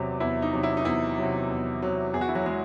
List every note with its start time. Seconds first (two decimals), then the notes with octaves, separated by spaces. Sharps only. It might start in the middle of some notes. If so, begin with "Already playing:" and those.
Already playing: E2 C3 F#3
0.20 E2 E4
0.42 D#4
0.53 C3 F#3
0.63 E4
0.77 D#4
0.85 E2 E4
1.18 C3 F#3
1.49 E2
1.83 C3 F#3
2.14 E2 G#4
2.21 F#4
2.28 E4
2.35 F#3 F#4
2.46 F#3 G#3 G#4